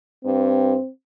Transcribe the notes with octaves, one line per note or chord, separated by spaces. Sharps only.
G2 C4